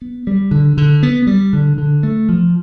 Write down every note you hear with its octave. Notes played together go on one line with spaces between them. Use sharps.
B3
G3
D3
D3
B3
G3
D3
D3
A3
F3